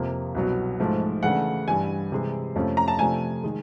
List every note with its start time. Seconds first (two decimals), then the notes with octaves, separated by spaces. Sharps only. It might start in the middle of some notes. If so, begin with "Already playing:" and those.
Already playing: F2 C3 F3 A#3
0.35 C2 B2 F#3 B3
0.80 G#2 F3 A3
1.23 C#3 E3 A3 D4 F#5
1.67 G2 E3 G3 G#5
2.12 C3 E3 G#3
2.56 F2 C3 F3 A3 C#4
2.77 A#5
2.88 A5
2.99 C3 F3 A3 D4 G#5
3.43 D#3 G#3